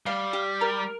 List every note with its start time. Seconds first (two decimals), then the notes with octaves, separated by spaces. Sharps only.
0.06 G3 F5
0.33 G4
0.61 A#4